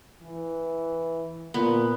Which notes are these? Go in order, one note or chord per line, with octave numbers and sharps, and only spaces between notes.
E3
A#2 B3